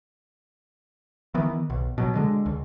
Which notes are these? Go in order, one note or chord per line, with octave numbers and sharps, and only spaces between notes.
D#3 E3 B3
B1
B2 F#3
D3 G#3
C#2